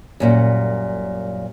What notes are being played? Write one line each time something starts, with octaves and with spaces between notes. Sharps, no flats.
F#2 A#2 G3